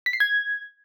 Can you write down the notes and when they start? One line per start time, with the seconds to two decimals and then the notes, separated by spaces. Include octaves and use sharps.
0.06 B6
0.13 C7
0.20 G#6